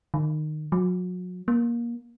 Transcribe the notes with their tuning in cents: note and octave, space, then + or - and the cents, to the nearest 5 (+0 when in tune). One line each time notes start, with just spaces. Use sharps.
D#3 -25
F#3 -35
A#3 +20